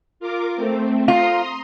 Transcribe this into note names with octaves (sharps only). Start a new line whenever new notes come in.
F4 A#4 D6
A3 C4
F4 A#5 C6 D#6